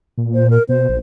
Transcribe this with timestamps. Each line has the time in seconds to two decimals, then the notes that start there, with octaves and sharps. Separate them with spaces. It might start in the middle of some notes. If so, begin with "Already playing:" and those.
0.18 A#2
0.34 C5
0.50 A#4
0.69 B2 C5
0.89 A#1